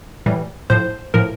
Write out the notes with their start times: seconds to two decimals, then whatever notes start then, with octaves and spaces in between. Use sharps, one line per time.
0.26 A2 E3 G3
0.70 A2 F3 C5
1.14 A2 F3 A#4